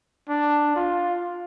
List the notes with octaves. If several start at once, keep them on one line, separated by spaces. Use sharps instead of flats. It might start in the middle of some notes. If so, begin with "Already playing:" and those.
D4
F4